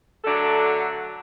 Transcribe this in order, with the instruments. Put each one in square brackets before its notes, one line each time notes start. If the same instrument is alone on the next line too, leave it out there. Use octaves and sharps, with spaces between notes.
[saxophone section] D3 F#3 A3 D4 F#4 A4